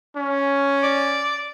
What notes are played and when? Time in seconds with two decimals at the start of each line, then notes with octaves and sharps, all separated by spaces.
0.17 C#4
0.83 D5